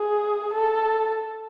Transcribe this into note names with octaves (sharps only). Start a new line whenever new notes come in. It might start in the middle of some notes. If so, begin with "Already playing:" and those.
Already playing: G#4
A4